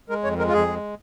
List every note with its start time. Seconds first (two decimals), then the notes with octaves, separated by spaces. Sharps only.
0.09 G#3 A#4
0.23 F2 C#5
0.38 G#3 A#4
0.48 F4
0.53 F2 G#4
0.68 G#3